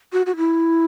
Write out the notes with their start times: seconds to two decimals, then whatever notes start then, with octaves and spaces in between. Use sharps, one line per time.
0.13 F#4
0.26 F#4
0.36 E4